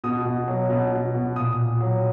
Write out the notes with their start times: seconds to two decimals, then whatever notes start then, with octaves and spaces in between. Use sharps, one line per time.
0.04 B2 D#6
0.25 B2
0.48 F#3
0.70 B2
0.92 B2
1.14 B2
1.36 A#2 D#6
1.58 A#2
1.81 F#3